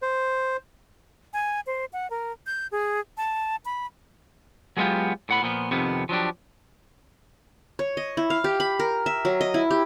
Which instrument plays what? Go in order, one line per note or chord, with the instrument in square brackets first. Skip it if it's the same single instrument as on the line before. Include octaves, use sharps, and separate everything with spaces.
[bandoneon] C5
[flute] G#5
C5
F#5
A#4
G6
G#4
A5
B5
[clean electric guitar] F#3 G#3 B3 C#4 F4 G4
A2 F#5 B5
A#2 F3 B3
F2 C3 D#3 B3
F3 F#3 D4 G4
[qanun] C#5
D#5
E4
F5
G4
B5
A#4
E5
F#3
D#5
E4
G4